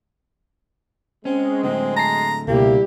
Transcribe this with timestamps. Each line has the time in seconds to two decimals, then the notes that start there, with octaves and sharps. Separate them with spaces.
1.25 G#3 C4 C#4
1.63 A2 D3 C4
1.96 A5 A#5 C7
2.48 C#2 B2 G3 A#3 E4 G4